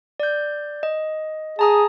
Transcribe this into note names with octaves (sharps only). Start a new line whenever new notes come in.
D5 G6
D#5
G#4 A5 A#5 D#6